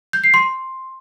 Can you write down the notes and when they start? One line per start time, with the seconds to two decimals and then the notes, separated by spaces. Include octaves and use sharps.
0.13 G6
0.24 C7
0.34 C6